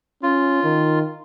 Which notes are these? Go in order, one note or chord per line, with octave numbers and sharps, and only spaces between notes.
C#4 F4
D#3